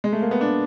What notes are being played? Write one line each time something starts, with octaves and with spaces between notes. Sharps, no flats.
G#3
A3
A#3
B3
D4